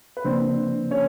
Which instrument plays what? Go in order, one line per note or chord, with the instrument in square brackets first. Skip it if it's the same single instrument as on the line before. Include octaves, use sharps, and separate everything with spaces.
[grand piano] B4
[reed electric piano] C#3 F3 A#3 D4 [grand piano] C4 C5
[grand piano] C#4 C#5